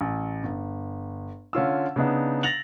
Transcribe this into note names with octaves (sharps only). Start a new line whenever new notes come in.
A1
G1
D3 C#4 F4 E6
C#3 B3 D4 D#4
A6 A#6 F7 F#7